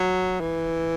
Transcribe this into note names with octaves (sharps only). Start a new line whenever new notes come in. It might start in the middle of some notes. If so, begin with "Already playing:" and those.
Already playing: F#3
E3